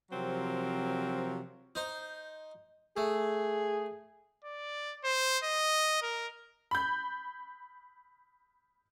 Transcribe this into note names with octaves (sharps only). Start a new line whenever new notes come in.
C3 F3 F#3 C4 A#4
D#4 C5
A3 G#4
D5
C5
D#5
A#4
B5 G6